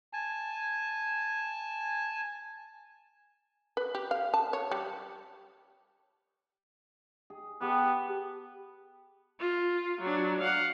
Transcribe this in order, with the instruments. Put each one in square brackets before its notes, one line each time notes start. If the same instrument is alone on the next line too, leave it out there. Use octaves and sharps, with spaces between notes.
[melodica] G#5 A5
[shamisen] B4
G4
F5
A5
C#5
G3
[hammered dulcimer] G#4
[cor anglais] B3 [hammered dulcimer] G4 G#4 A5
[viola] F4
F#3 D4
F5 F#5